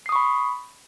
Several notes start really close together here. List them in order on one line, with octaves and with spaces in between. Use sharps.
C7 D#6 C#6 B5